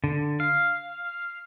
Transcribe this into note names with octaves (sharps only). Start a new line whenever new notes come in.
D3
F5